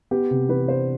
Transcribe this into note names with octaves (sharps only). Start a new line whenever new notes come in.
B3 G4
C3
E3 B4
D4 C5